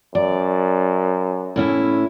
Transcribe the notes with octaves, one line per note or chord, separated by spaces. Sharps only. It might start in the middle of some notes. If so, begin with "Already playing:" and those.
F#2 D5
A2 C#4 E4